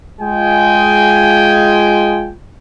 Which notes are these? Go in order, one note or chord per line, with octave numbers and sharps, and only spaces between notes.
G#3 F4 G5 G#5